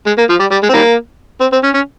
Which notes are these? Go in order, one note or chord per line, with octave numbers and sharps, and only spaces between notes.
G#3
A#3
F3
G3
G3
G#3
C4
D#3 G3 A#3
C4
C4
C#4
C#4